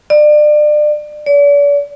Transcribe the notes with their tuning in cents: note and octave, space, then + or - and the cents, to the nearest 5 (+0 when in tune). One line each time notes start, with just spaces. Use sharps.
D5 +30
D5 -40